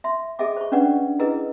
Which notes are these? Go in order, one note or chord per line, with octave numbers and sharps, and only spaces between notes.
E5 C6
G#4 A4 D#5 E5 D6
C5 C#6
C#4 D4 B4 D5 F#5
E4 G#4 A#4 B4 D#5